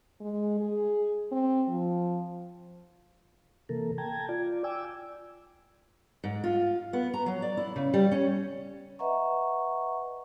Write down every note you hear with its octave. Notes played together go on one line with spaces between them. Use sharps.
G#3
G#4
C4
F3
C3 E3 A#3 A4 A#4
G5 A5 A#5 G#6
F4 D5
G5 G#5 D6 E6
G#2
F4
B3
A#5
F#3
D5
E4
C#3
G3
C#4
B4 D#5 E5 F#5 A#5 C#6